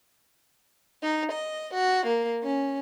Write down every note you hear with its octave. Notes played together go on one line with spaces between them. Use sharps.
D#4
D#5
F#4
A#3
C#4